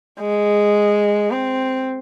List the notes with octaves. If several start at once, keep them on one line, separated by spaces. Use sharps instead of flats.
G#3
C4